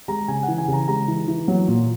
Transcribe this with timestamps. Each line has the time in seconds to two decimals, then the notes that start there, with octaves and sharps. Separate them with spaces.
0.08 G#3 A#5
0.28 C#3 G#5
0.43 F#5
0.48 E3
0.58 G#5
0.68 C#3
0.73 A#5
0.88 G#3 A#5
1.08 E3
1.28 E3
1.48 F#3
1.68 A#2